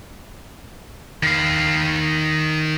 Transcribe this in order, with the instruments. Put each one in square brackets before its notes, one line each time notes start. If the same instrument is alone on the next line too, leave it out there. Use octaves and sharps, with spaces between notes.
[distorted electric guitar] D#3 F5